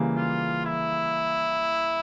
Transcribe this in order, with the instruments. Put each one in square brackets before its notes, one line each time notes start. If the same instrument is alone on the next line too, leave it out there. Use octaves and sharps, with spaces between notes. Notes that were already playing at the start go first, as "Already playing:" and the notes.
Already playing: [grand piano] C#3 E3 G3 A#3
[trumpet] F4
E4